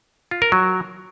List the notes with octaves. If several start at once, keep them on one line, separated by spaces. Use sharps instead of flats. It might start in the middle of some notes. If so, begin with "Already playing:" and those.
F4
A#4
F#3